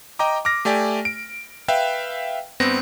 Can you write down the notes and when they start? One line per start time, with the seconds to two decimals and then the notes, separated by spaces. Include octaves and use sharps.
0.19 D#5 G5 A#5 D6
0.45 D6 F6 A#6
0.65 A3 G4 D5 G#5
1.05 D7
1.68 B4 E5 F5 G5
2.60 G2 B3 C4 A#6